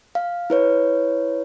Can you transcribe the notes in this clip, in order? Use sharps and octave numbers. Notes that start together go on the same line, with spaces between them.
F5
E4 B4 C#5